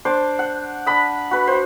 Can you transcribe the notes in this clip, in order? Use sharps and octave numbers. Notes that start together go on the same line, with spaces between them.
D4 C5 D6
F#5
D4 B5 D#6
F#4 B4
F#4 C5